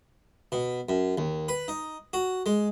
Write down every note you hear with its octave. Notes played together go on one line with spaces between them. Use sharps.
B2
F#2
D#2
B4
D#4
F#4
G#3